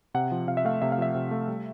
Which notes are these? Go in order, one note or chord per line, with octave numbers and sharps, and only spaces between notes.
C3 F#5
F3
C3 F5
E5
A3 F5
C3 E5
F5
F3 E5
C3
A3
G3